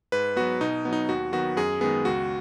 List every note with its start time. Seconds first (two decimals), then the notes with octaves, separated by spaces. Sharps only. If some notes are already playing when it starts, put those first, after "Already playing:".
0.12 G#2 B4
0.36 F#3 B3 F#4
0.61 B2 D#4
0.85 F#3 B3
0.93 D#4
1.09 D#2 F#4
1.32 D#3 F#3 B3 F#4
1.57 F#2 G#4
1.81 D#3 G#3 B3 G#4
2.05 C#2 F#4